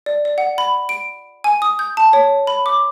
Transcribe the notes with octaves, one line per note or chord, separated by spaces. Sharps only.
D5
D5
F#5
B5
D7
G#5
D#6
G6
A5
C#5
B5
D6